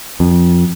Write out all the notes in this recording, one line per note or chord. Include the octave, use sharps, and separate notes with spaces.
F2